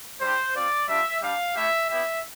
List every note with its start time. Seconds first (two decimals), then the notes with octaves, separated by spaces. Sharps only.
0.20 G3 D4 G4 C5
0.54 C4 F4 D5
0.88 G3 D4 F4 E5
1.21 G3 D4 G4 F5
1.55 A3 E4 G4 E5
1.88 B3 E4 G4 E5